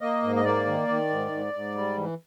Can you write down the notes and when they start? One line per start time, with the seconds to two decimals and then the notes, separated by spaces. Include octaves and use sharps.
0.01 A#3 D#5
0.22 G#2
0.36 D#5
0.44 A#3 D5
0.66 D#3
0.88 D#3
1.09 G#2
1.31 G#2
1.53 G#2
1.75 G3
1.97 E3